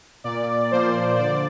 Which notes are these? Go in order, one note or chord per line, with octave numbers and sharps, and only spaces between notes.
A#2 D5
F3 A#3 C5
D3 D5